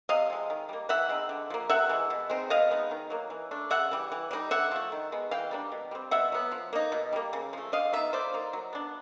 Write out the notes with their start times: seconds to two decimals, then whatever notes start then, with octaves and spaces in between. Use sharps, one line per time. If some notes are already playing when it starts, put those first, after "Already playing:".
0.09 C3 D#5 F5
0.30 F3 G#3
0.50 D#3
0.69 G3 A#3
0.89 E3 E5 F#5
1.09 G#3 C4 D#4
1.29 D3
1.50 F3 A#3
1.70 C3 E5 F#5
1.89 E3 G#3
2.10 B2
2.30 G#3 C4 D#4
2.50 B2 D#5 F5
2.71 G#3 B3 D#4
2.91 D#3
3.10 F#3 A#3
3.30 E3
3.51 A3 D4
3.70 C#3 E5 F#5
3.91 E3 G3
4.12 E3
4.31 G3 C4 D#4
4.51 D3 E5 F#5
4.72 F3 A3
4.92 D#3
5.12 G#3 B3
5.31 E3 F5 G5
5.51 G3 A#3 D4
5.72 B2
5.91 G3 C4
6.11 B2 E5 F#5
6.32 F#3 B3
6.52 F3
6.73 A#3 D#4
6.92 B2
7.13 G3 A#3
7.33 C#3
7.53 F3 A3
7.72 D3 D#5 F5
7.92 F#3 B3 D#4 E5
8.13 F3 C5 D5
8.34 A#3 D#4
8.53 F#3
8.73 B3 D4